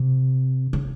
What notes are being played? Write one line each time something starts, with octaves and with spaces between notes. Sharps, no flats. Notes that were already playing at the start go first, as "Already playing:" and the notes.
Already playing: C3
C#3